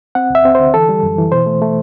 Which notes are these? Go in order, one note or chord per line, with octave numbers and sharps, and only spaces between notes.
C4 F#5
D2 E5
C4
D3 C5
E3 A4
G3
F#2
E3
B2 C5
A3
A3